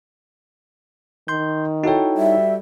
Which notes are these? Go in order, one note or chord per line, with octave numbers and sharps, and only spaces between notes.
D#3 C6 G6
D#4 E4 F#4 A4 C#5 G5
G3 E5